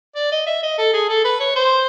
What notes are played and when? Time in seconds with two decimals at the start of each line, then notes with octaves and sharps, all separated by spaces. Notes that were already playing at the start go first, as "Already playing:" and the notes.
0.15 D5
0.32 D#5
0.46 E5
0.63 D#5
0.78 A4
0.94 G#4
1.09 A4
1.24 B4
1.40 C#5
1.55 C5